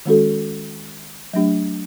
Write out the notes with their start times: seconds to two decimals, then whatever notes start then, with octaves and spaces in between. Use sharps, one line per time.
0.06 D#3 G#3 C#4 F#4 A4
1.34 F#3 A3 D4 G4